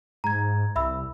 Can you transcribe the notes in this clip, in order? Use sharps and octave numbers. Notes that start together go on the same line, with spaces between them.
G#2 A#5 G#6
C2 E5 B5 E6